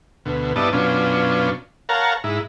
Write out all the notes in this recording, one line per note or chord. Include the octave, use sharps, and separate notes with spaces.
D2 B2
G2 B3 E4 D5 D#5 A5
F#2 B2 C#4 D4 F4
A#4 C#5 F5 F#5 A5 A#5
G#2 E4